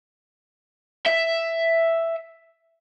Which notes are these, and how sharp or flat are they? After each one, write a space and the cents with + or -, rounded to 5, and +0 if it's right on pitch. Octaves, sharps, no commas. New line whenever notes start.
E5 +5